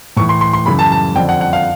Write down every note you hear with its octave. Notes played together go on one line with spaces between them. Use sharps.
A2 E3 C#6
C6
C6
C6
F#2 C#3 E3 B5
A5
A5
F2 D3 F3 G5
F#5
F#5
F5